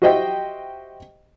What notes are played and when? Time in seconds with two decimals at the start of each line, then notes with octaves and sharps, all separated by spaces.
0.02 F#4 G4 C5 D#5 E5 G5